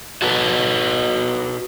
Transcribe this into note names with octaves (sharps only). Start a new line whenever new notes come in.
F#4 A4 B4